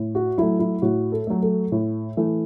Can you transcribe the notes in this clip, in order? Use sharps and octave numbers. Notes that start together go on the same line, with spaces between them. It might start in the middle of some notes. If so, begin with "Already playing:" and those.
Already playing: A2
F#4
F#3 A3 E4
E4
A2 F#4
A4
F#3 A3
A4
A2
E3 A3